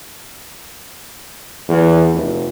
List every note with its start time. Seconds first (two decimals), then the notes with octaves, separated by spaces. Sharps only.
1.68 E2
2.13 F1